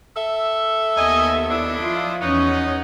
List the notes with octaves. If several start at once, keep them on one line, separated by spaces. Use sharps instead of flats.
A4 E5
D#2 B3 D#5 G#5
D4 E4 D#5
F3 F4
E2 B3 C#4 D#4 C#5 D#5